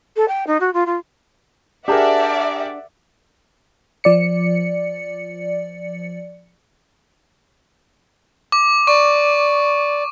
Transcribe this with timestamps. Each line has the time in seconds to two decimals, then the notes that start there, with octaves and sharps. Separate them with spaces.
0.16 A4
0.28 G5
0.47 D#4
0.60 F#4
0.74 F4
0.86 F4
1.88 D4 G4 G#4 A#4 D5 E5 F#5
4.04 F3 D5 C#7
8.52 D6
8.87 D5 C#6